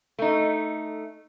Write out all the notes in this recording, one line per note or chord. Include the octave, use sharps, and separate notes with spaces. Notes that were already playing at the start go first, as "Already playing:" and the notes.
A3 D#4